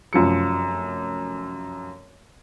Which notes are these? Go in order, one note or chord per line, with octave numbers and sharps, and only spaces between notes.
F1 F#2 F3 C#7